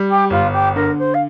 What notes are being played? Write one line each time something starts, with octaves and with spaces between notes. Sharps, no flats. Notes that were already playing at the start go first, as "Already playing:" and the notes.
Already playing: G3
G4
G1 F4
G4
D3 A#4
C5
F5